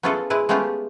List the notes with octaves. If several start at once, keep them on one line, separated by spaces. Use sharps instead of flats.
B3 C#4 E4 F4 G#4 A4
G#3 E4 B4
G#3 A3 B3 C#4 F4 G4